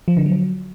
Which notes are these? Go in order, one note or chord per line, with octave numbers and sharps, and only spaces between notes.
F3
D3
F#3